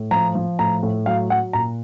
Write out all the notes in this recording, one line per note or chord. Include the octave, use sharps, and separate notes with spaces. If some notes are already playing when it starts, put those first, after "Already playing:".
Already playing: A2
F3 A#5
F3
A2 A#5
A2
F#3 F5
F#3 F#5
A#2 A#5